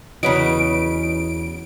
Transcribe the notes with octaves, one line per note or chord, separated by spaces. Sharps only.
E2 C#3 F#3 B4 D#5 D7